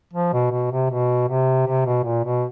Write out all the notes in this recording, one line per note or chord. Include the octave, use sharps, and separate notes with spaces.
F3
B2
B2
C3
B2
C3
C3
B2
A#2
B2